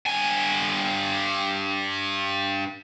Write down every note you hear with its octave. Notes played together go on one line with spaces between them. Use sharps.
G2 G#5